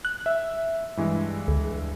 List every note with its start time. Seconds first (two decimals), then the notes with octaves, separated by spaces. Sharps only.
0.05 F#6
0.26 E5
0.97 G2 E3 G#3
1.48 D2